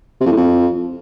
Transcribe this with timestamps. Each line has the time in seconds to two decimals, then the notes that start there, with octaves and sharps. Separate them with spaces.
0.21 C3
0.26 F2
0.31 A2
0.37 F2